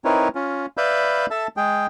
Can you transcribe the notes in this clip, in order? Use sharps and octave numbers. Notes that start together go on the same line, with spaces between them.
C4 D#4 E4 A#4 B4 C#5
C#4 F4
B4 D5 E5 F5 B5 G6
A4 E5 A5
G#3 G#4 G5